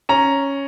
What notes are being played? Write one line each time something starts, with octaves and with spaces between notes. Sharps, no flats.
C#4 A#5